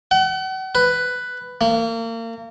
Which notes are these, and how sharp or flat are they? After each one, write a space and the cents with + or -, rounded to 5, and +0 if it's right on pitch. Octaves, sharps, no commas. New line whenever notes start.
F#5 +40
B4 +5
A#3 -35